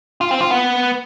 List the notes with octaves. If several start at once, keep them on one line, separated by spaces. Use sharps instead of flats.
F4
C4
F4
B3